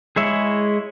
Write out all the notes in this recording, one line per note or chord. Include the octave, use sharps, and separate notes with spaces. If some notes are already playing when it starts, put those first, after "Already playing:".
G#3 E4 G#4 C#5 E5